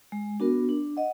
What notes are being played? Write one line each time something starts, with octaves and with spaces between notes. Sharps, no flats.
G#3
B3 D4 F#4 A#4
D4
D#5 F#5